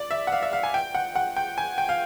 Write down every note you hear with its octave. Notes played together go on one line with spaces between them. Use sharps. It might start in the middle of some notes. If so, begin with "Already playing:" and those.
Already playing: D5
E5
F#5
F5
E5
F5
G#5
G5
F#5
F#5
G5
G#5
G5
F5